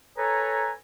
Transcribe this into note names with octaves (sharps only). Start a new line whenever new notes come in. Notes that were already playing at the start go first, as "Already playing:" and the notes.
A4 B4 C#5 G#5 A#5